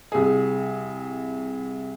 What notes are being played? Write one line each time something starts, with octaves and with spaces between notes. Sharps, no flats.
C2 G#4